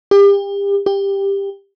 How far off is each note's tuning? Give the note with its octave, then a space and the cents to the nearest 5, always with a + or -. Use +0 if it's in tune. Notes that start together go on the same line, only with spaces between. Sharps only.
G4 +35
G4 +15